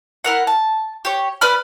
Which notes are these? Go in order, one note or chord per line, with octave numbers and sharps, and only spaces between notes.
E4 A#4 F#5
A5
G4 C#5
B4 D5 B5 F6